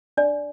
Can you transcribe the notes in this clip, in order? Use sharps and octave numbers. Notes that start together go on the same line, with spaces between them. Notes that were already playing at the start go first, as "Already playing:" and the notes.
D4 D5